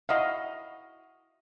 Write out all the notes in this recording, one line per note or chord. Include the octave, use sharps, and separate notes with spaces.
E4 F#4 D#5 F5